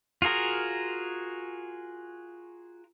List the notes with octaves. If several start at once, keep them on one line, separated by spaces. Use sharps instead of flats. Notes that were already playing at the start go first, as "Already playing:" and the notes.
F4 F#4 G#4 A#4